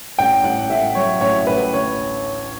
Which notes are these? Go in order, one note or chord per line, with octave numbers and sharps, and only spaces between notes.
A1 G5
A1 F#5
A2 E5
F#3 C#5
A1 C#5
C#5
A1 B4
D2 C#5